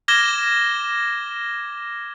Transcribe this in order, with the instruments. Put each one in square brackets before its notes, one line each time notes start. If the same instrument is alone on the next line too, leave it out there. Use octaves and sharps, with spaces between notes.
[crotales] D6 F6 G#6 A#6 E7 G7